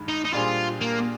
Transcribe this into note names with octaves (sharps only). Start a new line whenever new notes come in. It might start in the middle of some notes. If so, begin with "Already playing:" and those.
Already playing: G2 D#3 G#3
D#4
D#4
A#2 G3 D4 F4 G#4 C5
A#3